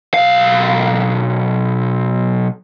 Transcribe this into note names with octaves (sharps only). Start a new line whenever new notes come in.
B1 F5